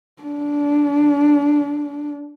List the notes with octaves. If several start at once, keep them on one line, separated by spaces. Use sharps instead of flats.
D4